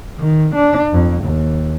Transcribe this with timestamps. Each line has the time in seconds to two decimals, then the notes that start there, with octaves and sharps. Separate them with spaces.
0.19 D#3
0.55 D4
0.93 F2
1.24 D#2